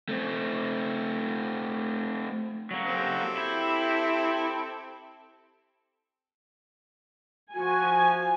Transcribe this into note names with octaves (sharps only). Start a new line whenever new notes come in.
A3 C4
F#3 A#3
C4 G4 A4
E4
F3 F#4 G#5